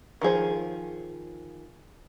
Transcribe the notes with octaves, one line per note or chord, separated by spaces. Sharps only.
D#3 F3 G#4 C5